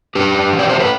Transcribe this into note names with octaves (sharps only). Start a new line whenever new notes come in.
D4 G4 B4
D4
E3
D5
A3 C5
B4